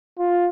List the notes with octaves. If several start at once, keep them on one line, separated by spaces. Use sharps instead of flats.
F4